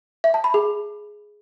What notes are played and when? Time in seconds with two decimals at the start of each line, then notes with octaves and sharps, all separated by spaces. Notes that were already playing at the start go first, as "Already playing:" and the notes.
0.24 E5
0.34 A5
0.44 B5
0.54 G#4